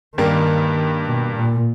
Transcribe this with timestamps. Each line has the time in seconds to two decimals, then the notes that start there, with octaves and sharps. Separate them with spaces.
0.17 G2 D#3 G3 A#3
1.06 B2
1.36 A#2